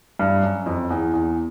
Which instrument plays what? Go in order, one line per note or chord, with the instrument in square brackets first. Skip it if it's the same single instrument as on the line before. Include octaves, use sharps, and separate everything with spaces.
[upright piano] G2
F#2
F2
E2
E2